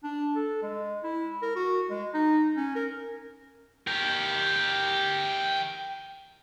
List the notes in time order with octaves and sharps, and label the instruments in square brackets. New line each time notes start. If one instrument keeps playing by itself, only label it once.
[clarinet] D4
A4
G#3
E4
A#4
F#4
G#3
D#4
C#4
A#4
[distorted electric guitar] G4 A#4